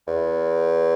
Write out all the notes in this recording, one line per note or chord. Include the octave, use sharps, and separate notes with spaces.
E2